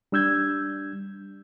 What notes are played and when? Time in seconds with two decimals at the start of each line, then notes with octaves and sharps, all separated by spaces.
0.12 G3 D4 E6 G6 G#6